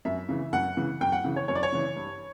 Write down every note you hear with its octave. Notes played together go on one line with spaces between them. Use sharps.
F#2 E5
C#3 E3
F#2 F#5
C#3 E3
F#2 G5
F#5
C#3 E3
C#5
F#2 C#5
D5
C#5
C#3 E3
G2